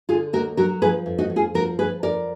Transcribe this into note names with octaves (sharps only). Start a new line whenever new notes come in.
D3 F4 G#4
D#2 F#4 A#4
F#3 F#4 A#4
F3 G#4 B4
F2
D#4 F#4
F2
F4 G#4
F3 F#4 A#4
F3 G#4 B4
F2 A#4 D5